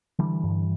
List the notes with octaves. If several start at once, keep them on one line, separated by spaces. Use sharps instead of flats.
D3 E3 G3
G2